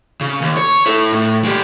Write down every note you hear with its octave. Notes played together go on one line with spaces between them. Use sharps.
C#3
D#2
C#5
E4 A4
A2
G#3 G4